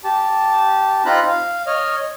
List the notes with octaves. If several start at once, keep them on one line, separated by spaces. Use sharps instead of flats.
G4 A5
C4 D#4 F4 A#5 B5 F#6
F5
C#5 D#5 F6